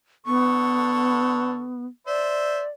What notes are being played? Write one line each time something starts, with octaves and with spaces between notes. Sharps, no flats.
D3 B3 A4 C#6
C5 D5 E5